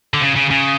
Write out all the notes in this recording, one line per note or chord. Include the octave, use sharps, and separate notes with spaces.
D3
C#3
C#3
C#3